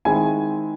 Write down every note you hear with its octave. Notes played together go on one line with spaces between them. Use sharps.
D#3 G#3 C4 E4 G#5